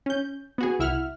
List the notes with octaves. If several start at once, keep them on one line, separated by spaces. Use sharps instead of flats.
C#4 G6
B3 F#4 G#4
C2 E4 E5 F#5 F6